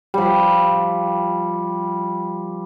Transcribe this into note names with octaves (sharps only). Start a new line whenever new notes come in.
F3 G3